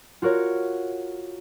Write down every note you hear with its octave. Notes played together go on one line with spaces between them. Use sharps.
F4 F#4 A#4 C#5